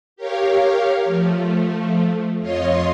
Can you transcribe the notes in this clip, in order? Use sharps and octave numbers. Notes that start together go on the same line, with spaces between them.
G4 A#4 C#5 F5
F3 A3
F2 F4 C#5 D#5 C6